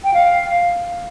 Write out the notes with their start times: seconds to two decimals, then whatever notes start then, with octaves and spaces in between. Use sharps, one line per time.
0.04 G5
0.14 F5